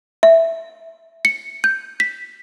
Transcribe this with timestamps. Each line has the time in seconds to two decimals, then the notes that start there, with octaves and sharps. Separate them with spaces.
0.23 E5
1.25 C#7
1.64 G6
2.00 B6